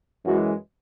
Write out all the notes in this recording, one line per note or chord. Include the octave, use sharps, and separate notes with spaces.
F#2 E3 G#3 F#4